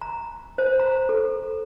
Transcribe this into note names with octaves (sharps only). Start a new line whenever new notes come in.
A#5
C5
A#5
A4